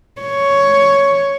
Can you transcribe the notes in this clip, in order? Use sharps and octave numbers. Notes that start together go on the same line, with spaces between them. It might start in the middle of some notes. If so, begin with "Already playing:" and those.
C#5